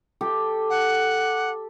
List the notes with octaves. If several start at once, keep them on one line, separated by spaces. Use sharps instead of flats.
G4 A4
F#5